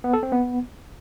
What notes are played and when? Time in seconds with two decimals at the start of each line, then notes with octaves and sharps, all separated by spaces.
0.04 B3
0.13 A4
0.23 C4
0.32 B3